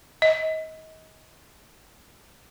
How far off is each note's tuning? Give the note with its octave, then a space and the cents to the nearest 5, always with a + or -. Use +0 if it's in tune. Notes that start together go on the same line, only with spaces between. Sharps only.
D#5 +30